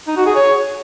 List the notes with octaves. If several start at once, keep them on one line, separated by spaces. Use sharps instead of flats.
D#4
F#4
G#4
C#5